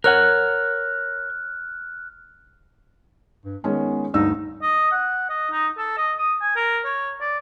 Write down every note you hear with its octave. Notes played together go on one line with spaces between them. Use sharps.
A#4 C#5 F#5 F6 F#6
G2
D#3 G#3 B3 C#4
D2 G2 D#4 E6
D#5
F#5
D#5
D#4
A4
D#5
D#6
G#5
A#4
C#5
D5